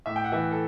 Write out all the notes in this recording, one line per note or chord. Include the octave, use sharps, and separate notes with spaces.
A2 E5
G5
F#5
E3 E5
A4